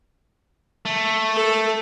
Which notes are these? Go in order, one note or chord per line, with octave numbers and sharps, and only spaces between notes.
A3
A4